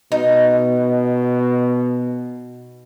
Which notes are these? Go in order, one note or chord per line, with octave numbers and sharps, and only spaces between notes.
B2 D#4